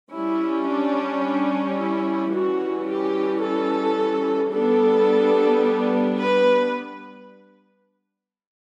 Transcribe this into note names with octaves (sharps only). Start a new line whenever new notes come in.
G3 C#4 E4
D4
D4
E4
E3 G3 C#4 F#4
G4
A4
G3 B3 D4 A4
B4